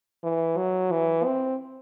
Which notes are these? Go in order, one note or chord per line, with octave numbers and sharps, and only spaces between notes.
E3
F#3
E3
C4